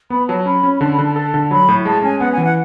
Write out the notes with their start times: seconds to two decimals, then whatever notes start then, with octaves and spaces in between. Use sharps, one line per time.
0.10 B3 B5
0.28 F#3 A5
0.45 C#4 B5
0.63 C#4
0.75 B5
0.81 D3 A5
0.93 B5
0.98 D3
1.05 A5
1.16 A4 A5
1.34 D3
1.51 F#3 B5
1.68 A2
1.85 G#3 A5
2.03 C#4 G#5
2.20 B3 F#5
2.32 G#5
2.38 E3
2.45 F#5